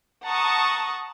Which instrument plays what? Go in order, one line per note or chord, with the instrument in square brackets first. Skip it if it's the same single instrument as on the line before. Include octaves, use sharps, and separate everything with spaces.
[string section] F#5 A5 A#5 C#6 D#6